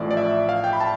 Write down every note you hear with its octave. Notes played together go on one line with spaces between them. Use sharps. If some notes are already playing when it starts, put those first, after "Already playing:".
Already playing: A1 A2 F3 D5
D5
E5
F5
G5
B5
A5